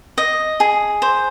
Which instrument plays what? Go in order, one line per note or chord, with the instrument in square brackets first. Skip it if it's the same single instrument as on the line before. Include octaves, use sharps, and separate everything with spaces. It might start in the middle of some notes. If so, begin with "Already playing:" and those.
[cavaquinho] D#5
G#4
C5